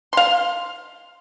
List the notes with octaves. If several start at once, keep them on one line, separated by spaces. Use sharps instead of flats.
F5 C6